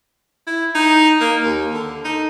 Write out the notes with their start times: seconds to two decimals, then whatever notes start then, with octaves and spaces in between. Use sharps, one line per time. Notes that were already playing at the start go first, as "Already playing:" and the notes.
0.47 E4
0.75 D#4
1.21 A#3
1.43 D#2
1.74 D3
2.05 D#4